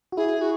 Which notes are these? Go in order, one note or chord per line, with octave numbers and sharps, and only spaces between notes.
F#4
E4 G#4
F#4